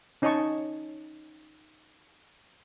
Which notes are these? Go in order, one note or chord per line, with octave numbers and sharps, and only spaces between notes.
C#4 D#4 C#5 D#5 A5 C#6